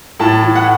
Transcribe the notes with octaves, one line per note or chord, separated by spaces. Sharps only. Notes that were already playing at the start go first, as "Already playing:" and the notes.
A2 A5
E3
F#5